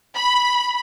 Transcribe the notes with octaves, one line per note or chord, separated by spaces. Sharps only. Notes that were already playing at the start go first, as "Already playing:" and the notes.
B5